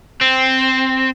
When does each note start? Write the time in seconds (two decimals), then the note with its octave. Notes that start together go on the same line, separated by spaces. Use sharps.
0.21 C4